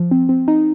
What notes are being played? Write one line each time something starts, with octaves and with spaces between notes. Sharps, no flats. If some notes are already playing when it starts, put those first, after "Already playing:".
Already playing: F3
C4
C4
D#4